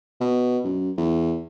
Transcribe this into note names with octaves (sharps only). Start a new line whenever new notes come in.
B2
F#2
E2